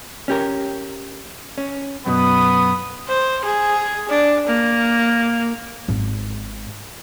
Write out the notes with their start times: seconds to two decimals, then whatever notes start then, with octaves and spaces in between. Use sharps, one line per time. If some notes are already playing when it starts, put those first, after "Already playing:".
0.28 C#4 G4 A#4
1.58 C#4
2.06 F#2 B2 B3 B5 D#6
3.08 C5
3.45 G#4
4.09 D4
4.47 A#3
5.88 G#1